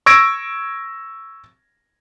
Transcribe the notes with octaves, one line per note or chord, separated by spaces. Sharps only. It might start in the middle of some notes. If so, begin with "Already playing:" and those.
C#6 E6 G#6 A#6 D7